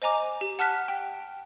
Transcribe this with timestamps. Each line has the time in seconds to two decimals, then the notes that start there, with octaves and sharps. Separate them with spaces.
0.02 C5 D#5 G#5 A#5 D6
0.41 G4
0.59 F#5 A5 F6 F#6 B6
0.88 G5